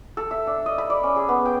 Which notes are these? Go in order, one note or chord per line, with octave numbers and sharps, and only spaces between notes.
A4
E5
D4
D#5
B5
D5
C#4
G#4
B3
G5